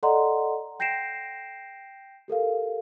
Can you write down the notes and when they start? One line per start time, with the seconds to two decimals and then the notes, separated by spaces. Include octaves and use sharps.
0.03 A4 D5 D#5 F#5 A#5 C6
0.79 G5 G6 A#6 C7 D7 E7
2.28 G4 A4 A#4 F5